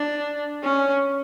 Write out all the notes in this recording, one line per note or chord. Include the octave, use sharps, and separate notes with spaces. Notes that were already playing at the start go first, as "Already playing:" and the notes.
Already playing: D4
C#4